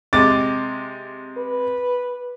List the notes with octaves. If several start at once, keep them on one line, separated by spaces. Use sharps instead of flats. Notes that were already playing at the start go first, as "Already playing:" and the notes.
C3 G#3 D6 A6
B4